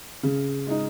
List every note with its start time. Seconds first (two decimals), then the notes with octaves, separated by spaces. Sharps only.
0.23 C#3
0.67 G#3 D#4